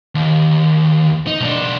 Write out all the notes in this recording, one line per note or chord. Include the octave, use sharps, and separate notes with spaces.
D#2
D#4
B1 D4